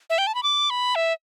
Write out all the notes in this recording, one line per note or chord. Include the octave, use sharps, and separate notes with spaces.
E5
G5
A5
B5
D6
B5
E5